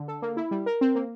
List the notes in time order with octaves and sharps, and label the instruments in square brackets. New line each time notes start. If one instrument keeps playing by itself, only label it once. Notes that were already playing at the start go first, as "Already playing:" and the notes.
Already playing: [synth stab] D3
A4
A#3
E4
G3
A#4
C4
A#3